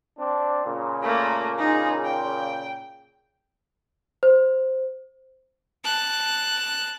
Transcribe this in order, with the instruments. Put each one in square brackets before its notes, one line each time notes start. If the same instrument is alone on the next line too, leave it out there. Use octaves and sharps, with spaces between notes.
[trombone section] C4 D4
A#2 C#3
[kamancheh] A3 A#3
D#4 G#4
G5
[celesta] C5
[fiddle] A5 F#6